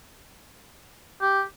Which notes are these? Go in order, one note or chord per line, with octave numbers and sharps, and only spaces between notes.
G4